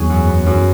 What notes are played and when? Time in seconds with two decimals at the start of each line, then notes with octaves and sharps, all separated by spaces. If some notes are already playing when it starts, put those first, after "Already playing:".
Already playing: E2 F#3 G#4
0.10 F#2
0.27 B3
0.46 F#2